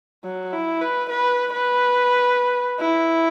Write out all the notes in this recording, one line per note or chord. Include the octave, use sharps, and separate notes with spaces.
F#3
E4
B4
B4
B4
E4